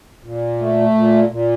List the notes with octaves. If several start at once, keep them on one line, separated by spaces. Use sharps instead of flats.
A#2
A3
A#2
A#2